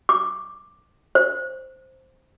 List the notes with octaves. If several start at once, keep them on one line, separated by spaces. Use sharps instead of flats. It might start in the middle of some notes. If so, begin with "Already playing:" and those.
D6
C5